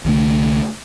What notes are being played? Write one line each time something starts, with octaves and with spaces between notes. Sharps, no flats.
C2 D3 G3 A3